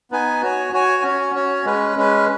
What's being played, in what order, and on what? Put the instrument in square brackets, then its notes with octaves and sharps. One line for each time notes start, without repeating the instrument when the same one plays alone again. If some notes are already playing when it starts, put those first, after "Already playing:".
[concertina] B3 D#4 B4 G#5
F#4 C#5 G#5
F#4 C#5 G#5
C#4 F#4 C#5
C#4 F#4 C#5
G#3 C#4 B4
G#3 C#4 B4